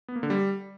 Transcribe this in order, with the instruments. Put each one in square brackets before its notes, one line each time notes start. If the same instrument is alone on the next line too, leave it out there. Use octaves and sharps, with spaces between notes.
[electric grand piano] B3
A#3
D3
G3